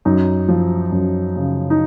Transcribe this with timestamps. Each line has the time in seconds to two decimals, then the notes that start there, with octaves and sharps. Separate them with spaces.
0.05 F#2 D#4
0.48 F3
0.92 F#2
1.36 C#3
1.70 D#4